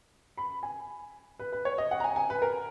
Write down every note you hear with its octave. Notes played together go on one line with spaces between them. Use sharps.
B5
G#5
B4
B4
C#5
D#5
F#5
A#5
G#5
G#5
B4
A#4